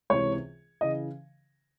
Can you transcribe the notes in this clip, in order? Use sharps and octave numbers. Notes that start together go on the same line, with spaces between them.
C#2 C3 E3 C#5
C#3 E3 D#5